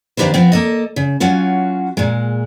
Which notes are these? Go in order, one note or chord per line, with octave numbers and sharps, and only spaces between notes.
D#3 A#3 D4 G4 B4 C5
F3 B3 C4
A#3 A4 D#5
C#3
F#3 C#4 F4 F#4
A#2 G#3